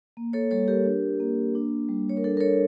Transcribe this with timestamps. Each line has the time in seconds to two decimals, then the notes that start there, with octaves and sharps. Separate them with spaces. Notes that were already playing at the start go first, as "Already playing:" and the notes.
0.17 A#3
0.33 A4 C#5
0.51 G3 A4 C#5
0.68 G4 A#4
0.85 D4
1.20 A#3
1.55 D4
1.89 G3
2.09 C#5
2.17 A#4
2.24 D4 A4
2.37 A#4
2.40 A4 C#5